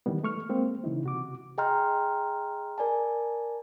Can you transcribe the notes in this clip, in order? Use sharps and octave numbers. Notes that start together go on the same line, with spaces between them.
D#3 E3 G3 B3
A3 C#6 F6
G#3 A#3 C4
C#3 E3 D#4 E4
C3 F#4 D6
G#4 D#5 G5 A#5 C6 F6
A#4 D5 G#5 A5